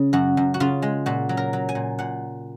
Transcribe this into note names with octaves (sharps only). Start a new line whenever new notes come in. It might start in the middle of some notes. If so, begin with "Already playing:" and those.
Already playing: C#3
F#2 F#4
F#2
F#4
C#3 F4
G#3
A#2 F#4
F#3
A#4
F#3
G#5
A#2
A#2 F#5